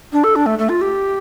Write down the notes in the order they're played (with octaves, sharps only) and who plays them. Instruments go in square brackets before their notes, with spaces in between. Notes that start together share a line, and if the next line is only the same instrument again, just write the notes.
[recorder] D4
A4
D4
A3
A3
F4
G4